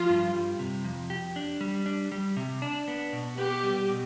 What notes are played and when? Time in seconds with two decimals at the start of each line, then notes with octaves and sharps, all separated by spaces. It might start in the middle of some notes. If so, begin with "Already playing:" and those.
Already playing: F3 F4
0.10 G2
0.34 G3
0.59 C3
0.84 F2
1.10 G4
1.36 D4
1.61 G3
1.86 D4
2.12 G3
2.37 C3
2.62 D4
2.88 B3
3.13 B2
3.38 B3 G4
3.63 G3
3.89 B2